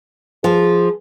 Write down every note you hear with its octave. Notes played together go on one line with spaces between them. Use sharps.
F3 G#4